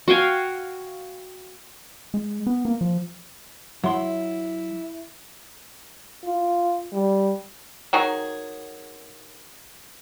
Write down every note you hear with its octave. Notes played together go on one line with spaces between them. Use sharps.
F#4 F5 G5 G#5
G#3
B3
A#3
F3
F#3 E4 C6
F4
G3
D#3 F#3 G#4